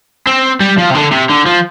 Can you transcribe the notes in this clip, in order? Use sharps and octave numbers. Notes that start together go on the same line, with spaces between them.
C4
G3
F3
C3
D3
C3
D3
F3